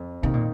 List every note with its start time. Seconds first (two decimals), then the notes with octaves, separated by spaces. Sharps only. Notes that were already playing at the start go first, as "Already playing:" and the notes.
Already playing: F2
0.22 C3 D#3 A#3 D#4
0.33 A#2